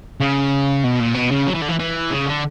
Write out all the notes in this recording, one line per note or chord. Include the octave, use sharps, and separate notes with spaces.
C#3
B2
A#2
B2
C#3
F#3
E3
D3
E3
E3
C#3
D3